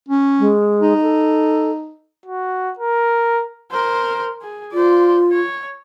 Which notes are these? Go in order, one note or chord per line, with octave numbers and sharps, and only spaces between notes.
C#4
G#3
D#4
A4
F#4
A#4
A#4 C5
G#4
F4 C5 D5
C#5